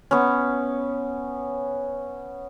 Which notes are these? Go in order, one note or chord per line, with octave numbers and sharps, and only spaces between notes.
B3 C#4